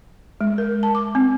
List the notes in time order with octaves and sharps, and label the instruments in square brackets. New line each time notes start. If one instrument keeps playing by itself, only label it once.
[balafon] G#3
A#4
A5
D6
C4